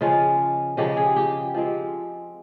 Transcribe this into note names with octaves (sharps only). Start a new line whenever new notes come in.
C#3 F3 G#3 C#4 F4
C#3 F3 G#3 C#4 G4
G#4
G4
F3 G#3 C4